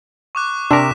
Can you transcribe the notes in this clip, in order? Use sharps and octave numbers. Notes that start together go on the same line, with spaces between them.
C#6 D6 F#6
C3 D4 A#4 B6 E7